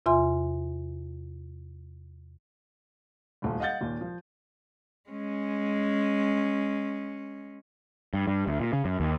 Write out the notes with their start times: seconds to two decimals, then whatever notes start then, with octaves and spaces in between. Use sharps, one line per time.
0.06 E2 C3 F4 E5 G#5 C6
3.42 D#1 D2
3.60 D#5 F5 F#5 G6 A6
3.81 D#2 A#2
4.01 F3
5.10 G#3 C#4
8.14 G2
8.27 G2
8.47 D2
8.60 A#2
8.73 C#3
8.85 F#2
9.00 D#2